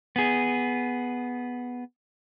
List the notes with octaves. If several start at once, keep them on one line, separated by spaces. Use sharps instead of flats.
B3 G#4